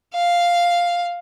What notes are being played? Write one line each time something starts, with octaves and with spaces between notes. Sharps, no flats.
F5